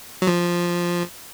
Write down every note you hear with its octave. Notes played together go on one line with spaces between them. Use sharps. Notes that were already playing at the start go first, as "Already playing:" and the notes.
F#3
F3